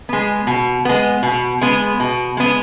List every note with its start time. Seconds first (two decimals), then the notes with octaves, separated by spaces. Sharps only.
0.09 G#3 B3
0.47 B2
0.85 G#3 B3
1.23 B2
1.61 G#3 B3
2.00 B2
2.37 G#3 B3